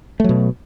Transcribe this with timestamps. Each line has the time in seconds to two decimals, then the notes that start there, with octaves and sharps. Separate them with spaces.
0.20 A3
0.24 F#3
0.29 B2